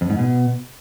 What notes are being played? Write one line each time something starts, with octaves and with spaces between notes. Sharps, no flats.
F2
G#2
B2